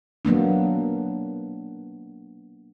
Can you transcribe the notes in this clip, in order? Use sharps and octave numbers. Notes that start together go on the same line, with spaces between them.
F#3 A#3 B3 D4